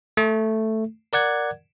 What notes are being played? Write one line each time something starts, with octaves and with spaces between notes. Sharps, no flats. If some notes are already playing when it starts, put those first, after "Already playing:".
A3
A#4 D5 F#5 G#6